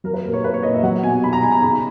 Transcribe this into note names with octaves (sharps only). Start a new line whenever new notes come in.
F#3 A#4
B4
A#2 A#4
C#5
A#2 B4
C#5
A#2 D#5
E5
F#3 F#5
B2 G#5
B2 B5
A#5
B2 G#5
A#5
C#3 B5